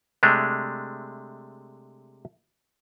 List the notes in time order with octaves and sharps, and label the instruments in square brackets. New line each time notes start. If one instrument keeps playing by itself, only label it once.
[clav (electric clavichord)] C3 G#3 A3 D4